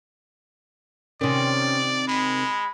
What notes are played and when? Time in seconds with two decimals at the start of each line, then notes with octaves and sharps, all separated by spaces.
1.21 C3 D#3 C#4 D5
2.07 G#3 B5